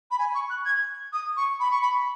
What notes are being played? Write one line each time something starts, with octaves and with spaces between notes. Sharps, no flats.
B5
G#5
C#6
F#6
G#6
D#6
C#6
B5
C#6
B5